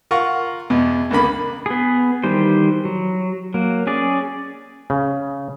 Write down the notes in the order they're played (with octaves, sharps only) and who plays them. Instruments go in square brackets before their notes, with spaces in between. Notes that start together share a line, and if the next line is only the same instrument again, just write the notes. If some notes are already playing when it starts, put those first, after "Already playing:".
[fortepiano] F4 A#4 F#5 C#6
E2 B2
C#2 D3 A#3 B5
[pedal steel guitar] B3 G#4
D#3 E3 G3 C5
F#3
F#3 A#3
C#4 G#4 D5
[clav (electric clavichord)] C#3